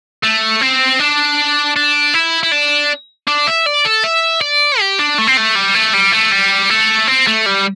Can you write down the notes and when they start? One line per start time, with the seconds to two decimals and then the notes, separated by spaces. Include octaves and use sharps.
0.24 A3
0.61 C4
0.99 D4
1.76 D4
2.14 E4
2.43 E4
2.52 D4
3.27 D4
3.47 E5
3.66 D5
3.85 A4
4.03 E5
4.41 D5
4.80 G4
4.99 D4
5.18 A3
5.27 C4
5.37 A3
5.56 G3
5.75 A3
5.94 G3
6.12 A3
6.32 G3
6.70 A3
7.07 C4
7.27 A3
7.46 G3